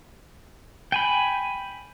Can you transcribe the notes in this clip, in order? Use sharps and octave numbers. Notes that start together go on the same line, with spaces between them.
G5 G#5 B5